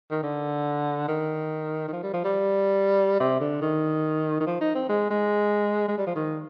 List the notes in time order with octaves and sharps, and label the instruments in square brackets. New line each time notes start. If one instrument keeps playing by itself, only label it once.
[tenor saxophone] D#3
D3
D#3
D#3
F3
G3
F3
G3
C3
D3
D#3
D#3
F3
D#4
C4
G#3
G#3
G#3
G3
F3
D#3